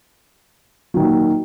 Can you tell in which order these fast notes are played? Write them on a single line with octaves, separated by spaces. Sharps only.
F#3 D#3 A#2